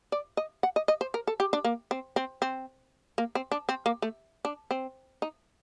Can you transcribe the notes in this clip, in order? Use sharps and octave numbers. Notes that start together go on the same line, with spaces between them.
D5
D#5
F#5
D#5
D#5
C5
A#4
A4
G4
D4
A#3
C4
C4
C4
A#3
C4
D4
C4
A#3
A3
D4
C4
D#4